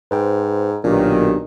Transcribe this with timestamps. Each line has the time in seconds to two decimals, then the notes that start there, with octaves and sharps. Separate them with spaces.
0.11 G#2 B4 C5 G5
0.84 B1 A#2 D#3 D4 G4